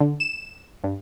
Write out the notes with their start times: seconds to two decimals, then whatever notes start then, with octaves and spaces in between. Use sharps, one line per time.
0.01 D3
0.20 E7
0.84 G2